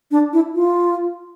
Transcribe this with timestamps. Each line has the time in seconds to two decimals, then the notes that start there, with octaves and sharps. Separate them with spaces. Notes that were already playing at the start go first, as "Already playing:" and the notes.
0.11 D4
0.33 E4
0.55 F4